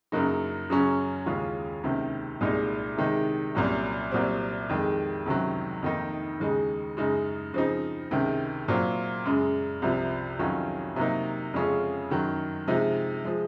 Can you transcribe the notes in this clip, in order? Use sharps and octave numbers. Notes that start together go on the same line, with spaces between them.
F#2 C#3 F#3 A#3 D#4
F#2 C#3 F#3 C#4
D#2 C#3 G#3 C#4 F4
C#2 C3 D#3 A#3
C2 A#2 G#3 D#4
C3 D#3 G#3 D#4
C2 A#2 F#3 C#4
C2 A#2 F#3 C4
F2 D#3 G#3
C#2 C3 D#3 F#3
F2 D#3 A#3 D#4
D#2 C#3 G#3 D#4
F#2 C#3 G#3 D#4
C#3 F3 C4 D#4
C#2 C3 D#3 G#3
A#2 F#3 C4 F4
F#2 C#3 G#3
C2 C3 F3
F2 D#3 F#3 C#4 F4
C3 F#3 A#3 D#4
F2 C#3 G#3 C#4 F4
F#2 D#3 F#3
C3 F3 G#3 D#4
F3 G#3